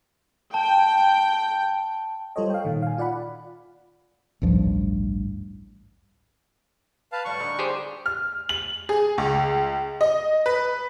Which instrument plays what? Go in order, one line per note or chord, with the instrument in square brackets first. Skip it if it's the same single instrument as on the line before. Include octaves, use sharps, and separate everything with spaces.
[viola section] G5 [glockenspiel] A5
[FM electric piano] G3 F4 A4 C5 C#5 D#5
F5 G5
A#2 D#3
F5 G#5
F4 D5 F#5 B5
[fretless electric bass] A1 D2 G2 F3
[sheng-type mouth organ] B4 F5 A5
[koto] A2 G3 F#4 [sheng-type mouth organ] C#6
[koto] D3 A#3 D#4
[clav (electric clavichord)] G4 G#4 C5
[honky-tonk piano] F6
F#7
G#4
C#2
D#5
B4